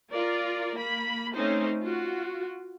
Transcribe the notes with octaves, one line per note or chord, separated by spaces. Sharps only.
F4 A#4 D5
A#3 B5
A3 C4 C#4 D#4 C5
F4 F#4